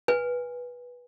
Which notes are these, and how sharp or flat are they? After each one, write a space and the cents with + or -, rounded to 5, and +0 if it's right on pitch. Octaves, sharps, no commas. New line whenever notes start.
B4 -10 G#5 -25